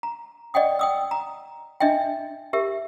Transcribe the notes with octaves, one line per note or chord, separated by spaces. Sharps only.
A#5
D5 D#5 F#5 G5 D#6
G5 D#6 E6
A#5
D4 D#5 E5 G5
G4 A#4 E5